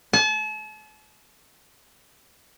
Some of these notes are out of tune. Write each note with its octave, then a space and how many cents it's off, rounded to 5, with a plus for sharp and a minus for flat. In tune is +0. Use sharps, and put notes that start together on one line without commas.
A5 -40